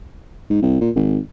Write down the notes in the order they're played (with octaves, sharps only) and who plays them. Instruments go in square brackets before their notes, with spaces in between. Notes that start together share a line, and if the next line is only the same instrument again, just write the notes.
[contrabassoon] G#2
C2
A#2
G#1